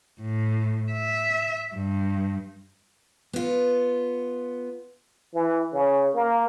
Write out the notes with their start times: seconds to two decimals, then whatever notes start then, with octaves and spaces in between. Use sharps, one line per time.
0.21 A2
0.92 E5
1.75 G2
3.33 B3 F4
5.34 E3
5.73 C#3
6.15 A#3